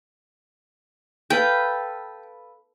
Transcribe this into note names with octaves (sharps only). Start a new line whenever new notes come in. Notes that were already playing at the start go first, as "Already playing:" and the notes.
A4 B4 F5 G5